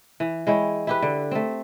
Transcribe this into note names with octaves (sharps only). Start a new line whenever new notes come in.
E3
G#3 E4 C#5 G5
E4 G4 B4
D3
A3 C4